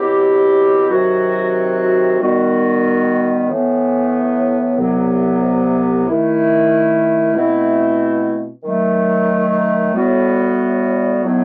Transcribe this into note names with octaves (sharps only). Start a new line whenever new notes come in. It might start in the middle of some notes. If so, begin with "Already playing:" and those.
Already playing: B2 F#3 C4 E4 G4
C3 D#3 F#3 C4 F#4
D#3 G3 B3 F#4
A2 E3 B3
C2 C3 F#3 B3
D#3 A3 E4
B2 A3 C4 E4
D#3 F#3 A3
A2 G3 B3 F#4
A2 F#3 B3 D#4